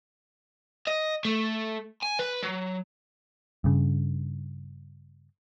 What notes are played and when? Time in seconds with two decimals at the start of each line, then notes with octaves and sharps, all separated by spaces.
0.87 D#5
1.25 A3
2.03 G#5
2.19 B4
2.43 F#3
3.64 G2 C#3